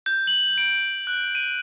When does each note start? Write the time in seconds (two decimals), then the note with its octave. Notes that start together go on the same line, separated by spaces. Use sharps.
0.06 G6
0.27 F#7
0.58 D7
1.07 F#6
1.35 D#7